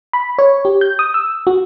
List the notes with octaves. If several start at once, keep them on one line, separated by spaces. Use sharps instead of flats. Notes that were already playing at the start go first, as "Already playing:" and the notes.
B5
C#5
G4
G6
D#6
E6
F#4